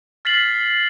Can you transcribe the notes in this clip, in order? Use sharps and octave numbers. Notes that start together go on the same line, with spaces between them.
F6 A6 B6 C7 F#7